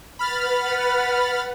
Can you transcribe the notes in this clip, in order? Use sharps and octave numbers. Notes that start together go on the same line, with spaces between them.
B4 F#5 B5 F6 A6